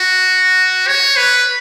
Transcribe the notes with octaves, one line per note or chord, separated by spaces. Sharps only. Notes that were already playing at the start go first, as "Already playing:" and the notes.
Already playing: F#4
C#5
B4